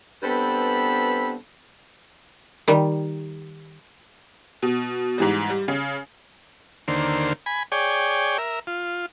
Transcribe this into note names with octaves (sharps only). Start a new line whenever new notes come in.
G2 B3 C4 A4 B5
D#3 G3
B2
G#2 E3 G3
G3
C#3
D#2 D3 A#3 C5
G#5 B5
G#4 C#5 D5 G5
A#4 E5
F4